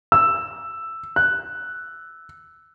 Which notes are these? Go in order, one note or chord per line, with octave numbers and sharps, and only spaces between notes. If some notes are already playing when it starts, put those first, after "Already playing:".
E6
F#6